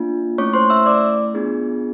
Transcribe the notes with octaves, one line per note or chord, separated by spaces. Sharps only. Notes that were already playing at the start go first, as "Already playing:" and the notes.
Already playing: A#3 D4 F4
A3 C#4 E4 C#5 C#6
C5 C6
E5 E6
D5 D6
B3 D4 F4 G#4